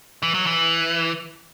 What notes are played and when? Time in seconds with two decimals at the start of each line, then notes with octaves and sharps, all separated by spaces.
0.23 E3
0.34 F#3
0.46 E3